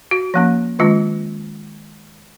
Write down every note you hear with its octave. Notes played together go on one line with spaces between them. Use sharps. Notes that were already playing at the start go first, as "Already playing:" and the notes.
F#4
F3 A#3 C#4
D#3 G#3 C#4 F4